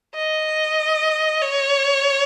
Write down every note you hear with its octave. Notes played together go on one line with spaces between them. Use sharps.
D#5
C#5